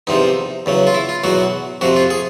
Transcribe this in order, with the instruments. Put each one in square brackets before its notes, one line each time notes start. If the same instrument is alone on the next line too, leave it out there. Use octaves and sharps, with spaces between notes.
[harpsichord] E2 C3 F3 D#4
E2 C#3 F#3
F4
E4
F4
E2 B2 F#3 F#4
F2 C3 F3 F#4
F4
G#4